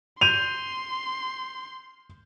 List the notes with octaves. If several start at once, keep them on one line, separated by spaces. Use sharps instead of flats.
C6 G6 D#7 F7